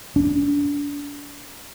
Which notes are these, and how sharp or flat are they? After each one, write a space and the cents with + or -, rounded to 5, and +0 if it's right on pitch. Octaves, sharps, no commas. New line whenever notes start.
D4 -30